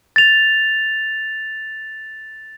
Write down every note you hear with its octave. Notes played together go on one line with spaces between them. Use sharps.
A6 F7